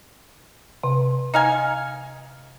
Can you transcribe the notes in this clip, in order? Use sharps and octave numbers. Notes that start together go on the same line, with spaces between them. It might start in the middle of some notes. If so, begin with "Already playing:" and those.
C3
D#4 F5 G#5